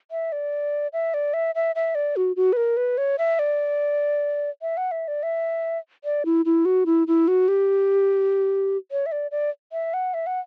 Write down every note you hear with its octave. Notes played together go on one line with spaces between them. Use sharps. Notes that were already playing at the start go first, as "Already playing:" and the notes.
E5
D5
E5
D5
E5
E5
E5
D5
F#4
F#4
B4
A#4
B4
C#5
E5
D5
E5
F#5
E5
D5
E5
D5
E4
E4
F#4
E4
E4
F#4
G4
C#5
E5
D5
D5
E5
F#5
E5
F#5